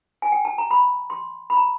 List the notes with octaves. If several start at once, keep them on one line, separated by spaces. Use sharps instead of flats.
G#5
G5
A5
A#5
B5
C6
B5
A#5